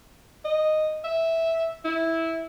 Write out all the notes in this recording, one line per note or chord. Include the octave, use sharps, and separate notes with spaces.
D#5
E5
E4